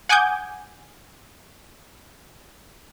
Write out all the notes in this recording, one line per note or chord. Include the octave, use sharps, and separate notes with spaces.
F#5 G#5 D6 D#6 G6 G#6